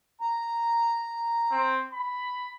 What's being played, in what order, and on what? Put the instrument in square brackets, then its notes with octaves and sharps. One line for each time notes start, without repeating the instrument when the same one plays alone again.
[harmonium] A#5
[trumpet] C4
B5